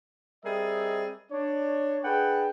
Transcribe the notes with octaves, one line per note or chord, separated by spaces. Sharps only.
G3 C4 G#4 A#4 D#5 E5
D4 C#5
D4 G#4 B4 F#5 G5